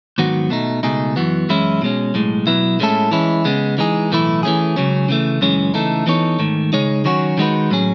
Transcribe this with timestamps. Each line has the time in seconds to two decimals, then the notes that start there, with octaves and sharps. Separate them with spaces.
0.18 G#2 D#3 F#3 B3 F#4
0.50 B2 A3 D#4
0.83 C#2 B2 A3 D#4 G#4
1.16 F#2 E3 B3 F#4
1.49 F#2 E3 G#3 C#4 E4
1.82 B2 G#3 C#4
2.14 B1 A2 G#3
2.47 B2 F#3 B3 E4 B4
2.80 A2 G#3 C#4 E4 A4
3.11 E3 G#3 C#4 E4
3.45 C#3 G#3 B3
3.78 E3 G#3 D#4 G#4
4.11 B1 A2 E3 A3 E4
4.43 E3 A3 C#4 G#4
4.76 C#2 C#3 F#3 C#4
5.09 C#3 E3 A3
5.41 F#2 C#3 E3 G#3 C#4
5.74 C#3 E3 A3 D#4 A4
6.07 E3 B3 D#4 A4 C#5
6.39 G#2 D#3 A3
6.73 C#3 G#3 D#4 G#4 C#5
7.05 D#3 F#3 C#4 F#4 C#5
7.38 D#3 G#3 D#4 F#4 B4
7.71 A2 F#3 C#4 G#4